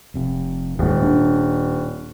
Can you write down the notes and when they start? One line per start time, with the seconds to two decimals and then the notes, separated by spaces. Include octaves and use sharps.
0.14 F1 C3
0.79 D#1 D#2 G#2
1.02 D4